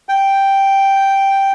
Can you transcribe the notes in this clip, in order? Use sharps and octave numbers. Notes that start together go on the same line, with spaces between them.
G5